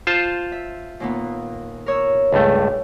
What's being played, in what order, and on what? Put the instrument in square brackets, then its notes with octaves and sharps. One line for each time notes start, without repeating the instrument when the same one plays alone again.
[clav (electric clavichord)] F4 C5 A5
[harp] E5
D#2 A#2 B3
A#4 C#5 E6
[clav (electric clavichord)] C#2 G2 A3